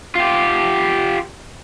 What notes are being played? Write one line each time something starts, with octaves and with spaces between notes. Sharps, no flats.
F4 G4